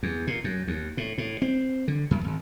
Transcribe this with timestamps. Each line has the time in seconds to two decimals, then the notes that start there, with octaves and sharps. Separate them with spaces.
0.03 E2
0.27 A#2
0.44 F#2
0.67 D#2
0.97 A2
1.18 A2
1.42 C4
1.88 D3
2.11 F#2
2.24 G#1